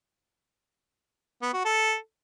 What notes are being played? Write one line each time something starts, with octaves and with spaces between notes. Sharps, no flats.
B3
F#4
A4